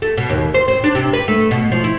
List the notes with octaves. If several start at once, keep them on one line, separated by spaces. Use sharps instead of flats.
A3
B2
D#2
C5
C4
D4
C3
B4
A3
B2
F3
E4